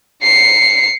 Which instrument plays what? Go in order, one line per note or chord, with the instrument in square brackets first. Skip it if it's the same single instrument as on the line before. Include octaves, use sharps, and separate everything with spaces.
[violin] C7 C#7